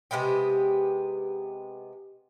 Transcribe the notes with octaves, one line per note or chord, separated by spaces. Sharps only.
C3 G#3 B3 G4